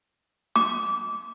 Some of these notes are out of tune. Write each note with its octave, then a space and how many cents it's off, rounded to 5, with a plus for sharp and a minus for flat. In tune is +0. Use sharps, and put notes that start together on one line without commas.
D6 -20